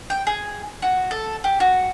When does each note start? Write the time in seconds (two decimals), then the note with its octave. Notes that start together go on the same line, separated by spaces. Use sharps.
0.10 G5
0.27 G#4
0.82 F#4
1.11 A4
1.44 G4
1.60 F#4